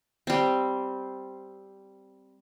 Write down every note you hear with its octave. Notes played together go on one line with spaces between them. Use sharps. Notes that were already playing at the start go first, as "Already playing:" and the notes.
G3 C4